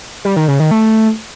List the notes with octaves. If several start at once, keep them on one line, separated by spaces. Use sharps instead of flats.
G3
D#3
C#3
D#3
A3